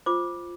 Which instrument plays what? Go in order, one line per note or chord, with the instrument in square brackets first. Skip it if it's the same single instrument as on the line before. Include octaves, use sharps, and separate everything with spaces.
[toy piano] F4 C5 D6